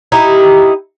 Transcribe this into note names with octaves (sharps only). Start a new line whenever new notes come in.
D#4 E4 G4